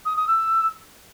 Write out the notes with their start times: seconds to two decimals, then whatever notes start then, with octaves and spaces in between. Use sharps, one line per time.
0.05 D#6
0.17 D#6
0.28 E6